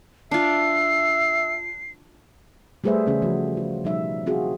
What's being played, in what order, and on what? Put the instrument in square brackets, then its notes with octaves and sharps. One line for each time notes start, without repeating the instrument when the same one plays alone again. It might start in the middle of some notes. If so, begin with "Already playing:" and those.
[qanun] D4 F4 [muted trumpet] E5 [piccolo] C7
[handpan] G3 A3 G#4 B4 C5 E5
C#3 E3 C#4 G#4
F3 F#4
F4
B2 F3 G3 D#4 E5
C4 F4 F#4 G#4